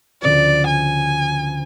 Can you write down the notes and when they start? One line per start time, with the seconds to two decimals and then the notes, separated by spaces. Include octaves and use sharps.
0.22 D2 C#3 F3 D5
0.67 G#5